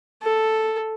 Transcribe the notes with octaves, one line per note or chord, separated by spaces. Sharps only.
A4